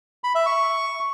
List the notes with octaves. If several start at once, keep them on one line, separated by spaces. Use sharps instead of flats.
B5
E5
C#6